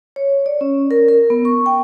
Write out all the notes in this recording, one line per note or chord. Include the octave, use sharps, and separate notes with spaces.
C#5
D5
C#4
A#4
A#4
B3
C#6
G5